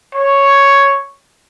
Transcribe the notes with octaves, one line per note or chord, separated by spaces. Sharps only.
C#5